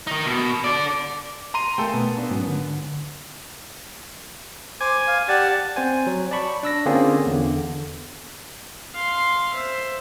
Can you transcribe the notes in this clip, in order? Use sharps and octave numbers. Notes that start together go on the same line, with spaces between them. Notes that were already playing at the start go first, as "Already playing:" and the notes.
D#3 D#4
B2
A4 D5
A#5 C6 D#7
A3 A#3 G#4 A4 G5
B2 B3
A#3 D4
G#2 F#3 C#4
D3
C5 G#5 D6
F5
G4 D5 F#5 A5
C4 C5 G#5
F#3
D5 A5 B5 C#6
D4 E6 A#6
D3 A#3 C4 C#4 F4 G#4
E2 D3
F5 C6
C5 E5